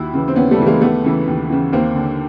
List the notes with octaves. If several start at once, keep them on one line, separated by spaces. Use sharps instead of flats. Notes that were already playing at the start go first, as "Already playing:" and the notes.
Already playing: D#2 E4 F#4
C#3 E3
C4
D#2 B3 C#4
G3 A3
C#3 E3
G#3 A#3
D#2 A3 B3
C#3 E3
D#2
C#3 E3
D#2 A#3 C4
D3